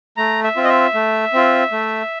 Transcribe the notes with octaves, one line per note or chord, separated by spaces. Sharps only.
A3 A#5
E5
C4 F4
D#5
E5
A3
C4 F4
A3